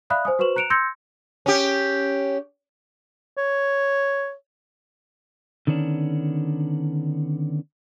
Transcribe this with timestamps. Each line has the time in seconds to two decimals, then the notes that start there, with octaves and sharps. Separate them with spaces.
0.10 D5 E5 F5 B5 D#6 F#6
0.25 C5 G#5 D#6
0.39 F#4 B4 C5 C#6 E7 F#7
0.56 A#5 F#6 C#7 D7 E7 F7
0.70 C6 E6 G6 G#6 A#6 C#7
1.46 C#4 G4
3.38 C#5
5.67 D3 D#3 B3 C#4 D4